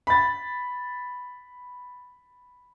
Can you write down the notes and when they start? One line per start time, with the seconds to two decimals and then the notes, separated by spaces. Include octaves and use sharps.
0.07 B5 A6